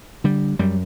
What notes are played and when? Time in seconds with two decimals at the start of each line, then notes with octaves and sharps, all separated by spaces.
0.24 D3 G3
0.59 F#2 G3